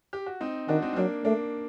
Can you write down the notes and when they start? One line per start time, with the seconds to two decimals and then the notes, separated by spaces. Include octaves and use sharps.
0.13 G4
0.26 F#4
0.41 C4 D#4
0.68 D#3 D4 F#4
0.82 C4 D#4
0.93 C4
0.96 F#3 A#3 D4
1.25 A3 A#3 D4